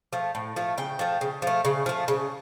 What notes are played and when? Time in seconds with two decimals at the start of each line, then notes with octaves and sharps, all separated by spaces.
0.13 F3 A3
0.35 A2
0.56 F3 A3
0.78 C#3 G5
0.99 F3 A3
1.21 C#3
1.42 F3 A3
1.65 C#3
1.86 F3 A3
2.08 C#3